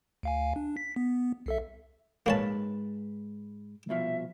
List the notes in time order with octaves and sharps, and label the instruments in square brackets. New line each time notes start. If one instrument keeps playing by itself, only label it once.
[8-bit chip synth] D2 F5 G#5
D4
B6
B3
C2 A4 E5
[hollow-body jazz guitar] G#2 G#3 B4 [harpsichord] A#3 C#5 A5
[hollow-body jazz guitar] C2 B2 F3 [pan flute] E5